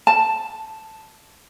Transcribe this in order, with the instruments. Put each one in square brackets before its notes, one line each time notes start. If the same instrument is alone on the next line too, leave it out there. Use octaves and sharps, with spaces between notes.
[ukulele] A5